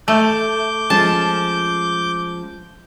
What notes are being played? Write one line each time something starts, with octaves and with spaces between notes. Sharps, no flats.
A3 D6 G6
F3 G#3 C#4 A5